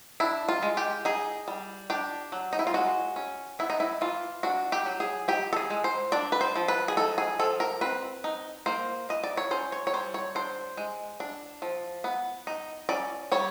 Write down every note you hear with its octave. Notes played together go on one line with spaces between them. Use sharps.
D4 E4
F4
G#3
G4
D#4 G#4
G3
D4 G4
F#3
D#4
E4
F4
G#3 F#4
C#4
B3 E4
D#4
E4
E3 F4
D4 F#4
G4
F#3
G#4
D#4 G4
A4
G#4
G#3
C5
D4 D5
B4
C5
F3
B4
G#4
D#4 A4
G#4
F3 A4
A#4
C4 B4
D#4
A#3 C5
E3 D#5
D5
C#5
C#4 C5
C#5
C#5
G3 C5
C#5
D4 C5
G#3
D4
F3
B3
D#4
C#4 D5
G3 C#5